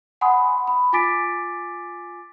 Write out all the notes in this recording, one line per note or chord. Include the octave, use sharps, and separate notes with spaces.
F#5 G#5 B5 C6 D#6
B5
F4 G#5 D6 A6 B6 D7